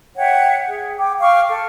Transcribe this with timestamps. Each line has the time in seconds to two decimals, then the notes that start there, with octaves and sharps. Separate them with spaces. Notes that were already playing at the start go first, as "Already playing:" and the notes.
0.16 C#5 E5 F#5 G5
0.68 G#4
0.99 G5 D6
1.20 F5 G5 C#6 D6
1.48 A4